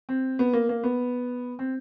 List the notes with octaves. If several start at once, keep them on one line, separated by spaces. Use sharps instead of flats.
C4
B3
A#3
A#3
B3
C4